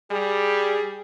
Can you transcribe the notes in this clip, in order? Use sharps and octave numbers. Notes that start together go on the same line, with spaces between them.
G3 G#4